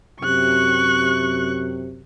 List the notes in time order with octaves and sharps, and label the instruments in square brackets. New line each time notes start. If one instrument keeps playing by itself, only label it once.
[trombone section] F#2 C3 [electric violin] C#6 F#6